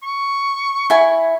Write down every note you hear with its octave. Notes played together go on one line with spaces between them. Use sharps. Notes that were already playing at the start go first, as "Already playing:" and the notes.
C#6
E4 G#5